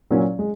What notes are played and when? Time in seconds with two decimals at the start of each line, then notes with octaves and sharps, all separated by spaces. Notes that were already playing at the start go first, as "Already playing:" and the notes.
0.11 A#2 F#3 C#4
0.39 G#3